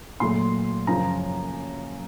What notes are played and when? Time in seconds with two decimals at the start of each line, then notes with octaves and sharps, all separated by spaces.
0.20 A#2 F#3 A3 C6
0.87 F#2 C#3 F3 A#5